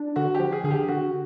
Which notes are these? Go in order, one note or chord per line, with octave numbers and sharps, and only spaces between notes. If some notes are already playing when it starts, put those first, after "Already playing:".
Already playing: D4
D3 F#4
G4
F3
G#4
D3 G#4
G4
D3 F#4